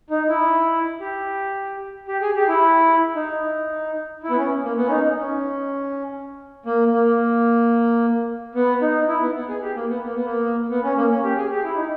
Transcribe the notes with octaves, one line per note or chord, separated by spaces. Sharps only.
D#4
E4
G4
G4
G#4
G4
E4
D#4
E4
B3
C#4
A#3
B3
C#4
D#4
D#4
C#4
A#3
A#3
B3
D#4
E4
B3
B3
G#4
G4
A#3
B3
A#3
B3
A#3
B3
C#4
A#3
C#4
G4
G#4
G4
E4
D#4